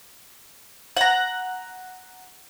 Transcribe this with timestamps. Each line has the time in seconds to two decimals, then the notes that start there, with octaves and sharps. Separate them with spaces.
0.97 F#5 A#5